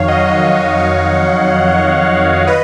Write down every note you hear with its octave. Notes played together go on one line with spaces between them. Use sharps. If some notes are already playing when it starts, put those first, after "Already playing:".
Already playing: F2 D#3 F#3 C#5 F5
D#5 F#5
D#5 F#5
B4 D#5